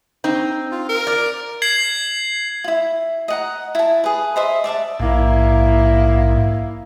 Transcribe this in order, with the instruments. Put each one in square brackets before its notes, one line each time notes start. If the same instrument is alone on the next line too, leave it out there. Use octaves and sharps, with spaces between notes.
[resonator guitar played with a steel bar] C4 D#4
[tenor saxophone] F4
A#4
[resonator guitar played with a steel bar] D5
[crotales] G#6 C7 F#7
[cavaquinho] E4 F4
D#5 F#5 A#5
E4 A5
G#4 B4
C5 D#5 E5
D5 E5 F5 A5
[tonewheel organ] A#1 G#2 [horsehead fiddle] A#3 E4